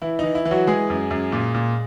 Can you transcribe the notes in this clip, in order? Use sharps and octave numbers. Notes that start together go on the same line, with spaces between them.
E3 E4
E3 D#4
E4
E3
F#3 F#4
E3 G#3 G#4
F#2
F#2
A#2
A#2